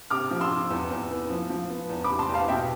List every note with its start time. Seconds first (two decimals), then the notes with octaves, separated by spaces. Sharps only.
0.10 C3 D6 F6
0.31 F3
0.41 C6 E6
0.50 C3
0.70 E2
0.90 E2
1.10 B3
1.30 F3
1.50 F3
1.70 B3
1.90 E2
2.04 B5 D6
2.09 C3
2.19 A5 C6
2.28 E2
2.34 F5 A5
2.48 B2 E5 G5